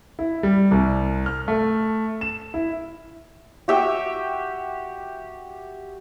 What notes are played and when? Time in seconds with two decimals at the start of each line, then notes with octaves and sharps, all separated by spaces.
0.19 E4
0.43 G3
0.71 C2
1.26 F6
1.48 A3
2.21 E7
2.54 E4
3.68 F#4 G4 E5